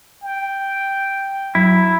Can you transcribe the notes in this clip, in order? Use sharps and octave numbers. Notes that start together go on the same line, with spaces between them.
G5
F#3 E4